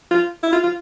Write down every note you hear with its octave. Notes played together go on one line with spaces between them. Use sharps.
F4
E4
F4
F4